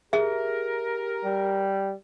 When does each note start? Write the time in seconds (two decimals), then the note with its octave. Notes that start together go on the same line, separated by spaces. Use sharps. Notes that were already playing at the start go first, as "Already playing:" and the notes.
0.13 G4 G#4 A#4 E5
1.25 G3